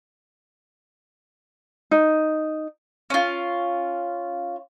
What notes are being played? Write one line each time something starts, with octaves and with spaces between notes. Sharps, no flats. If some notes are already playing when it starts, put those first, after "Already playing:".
D#4
C#4 F4